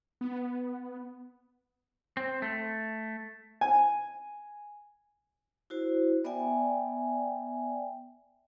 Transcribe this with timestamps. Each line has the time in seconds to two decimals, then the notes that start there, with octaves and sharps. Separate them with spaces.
0.21 B3
2.17 C4
2.42 A3
3.61 G#5
5.70 E4 F#4 C5
6.25 B3 D5 E5 G5 G#5